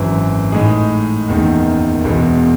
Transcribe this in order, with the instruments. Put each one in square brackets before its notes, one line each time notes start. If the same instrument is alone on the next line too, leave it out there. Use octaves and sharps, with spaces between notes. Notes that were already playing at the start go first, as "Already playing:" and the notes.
Already playing: [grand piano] G#1 F#2 E3
A2 G#3 D#4 G#4
F#1 E2 D#3
E1 E2 B2